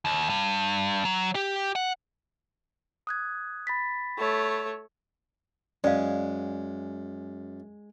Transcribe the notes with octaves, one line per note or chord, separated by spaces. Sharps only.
D#2
G2
F#3
G4
F#5
D#6 F#6 G#6
B5 A6 B6
A3 C#5
F#2 G#3 D5 F5